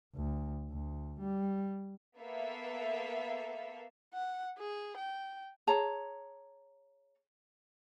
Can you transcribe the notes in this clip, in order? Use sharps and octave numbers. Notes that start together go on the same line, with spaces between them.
D2
D2
G3
A#3 B3 A4 E5 F5
F#5
G#4
G5
G#4 C#5 A5 A#5